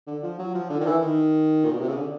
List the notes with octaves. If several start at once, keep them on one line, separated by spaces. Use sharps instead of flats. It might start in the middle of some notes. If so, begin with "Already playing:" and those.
D3
F3
F#3
F3
D3
D#3
E3
D#3
A#2
B2
C3
C#3
D3